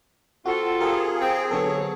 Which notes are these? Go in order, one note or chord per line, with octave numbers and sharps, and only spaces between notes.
C4 F4 F#4 A4
G4 G#4 A#4 F5
C4 G5
D3 F#3 B3 A4 C#5